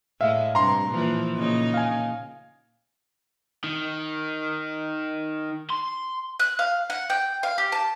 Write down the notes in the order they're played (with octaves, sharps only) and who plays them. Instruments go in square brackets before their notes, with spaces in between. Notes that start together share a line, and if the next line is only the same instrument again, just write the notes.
[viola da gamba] A2 G#3 [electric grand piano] E5 F5
[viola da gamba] G2 C3 [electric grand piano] A#5 C6
[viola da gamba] A#2 E3 F3
A#2 C#3 D#4
[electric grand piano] F5 G#5
[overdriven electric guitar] D#3
C6
[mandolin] F#6
F5
F#5
G5
F5
G4
A5